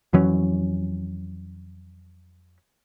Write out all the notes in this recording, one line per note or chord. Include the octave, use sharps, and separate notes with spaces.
F2 E3 F#3 C#4